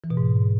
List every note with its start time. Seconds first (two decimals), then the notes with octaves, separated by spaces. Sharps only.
0.04 E3
0.10 B2
0.17 G#2